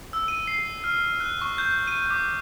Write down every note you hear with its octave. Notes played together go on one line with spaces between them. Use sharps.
E6
D#7
C7
F6
F#6
C#6
G6
D#7
D6